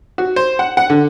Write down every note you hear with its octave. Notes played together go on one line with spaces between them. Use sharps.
F#4
C5
F#5
F#5
D3